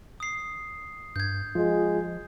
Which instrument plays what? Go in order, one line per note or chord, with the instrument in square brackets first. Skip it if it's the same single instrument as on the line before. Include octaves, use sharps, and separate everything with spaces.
[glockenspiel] D#6 C7
[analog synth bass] G2 [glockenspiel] G6 G#6
[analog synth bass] F3 [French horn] G#3 [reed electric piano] F4